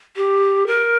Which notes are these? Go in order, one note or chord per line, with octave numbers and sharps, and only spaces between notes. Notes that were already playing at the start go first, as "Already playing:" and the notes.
G4
A#4